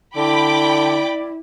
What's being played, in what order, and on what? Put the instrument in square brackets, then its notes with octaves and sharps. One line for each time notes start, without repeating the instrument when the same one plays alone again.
[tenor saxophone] D3 [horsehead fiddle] E4 [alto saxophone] D5 [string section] G5 B5 D6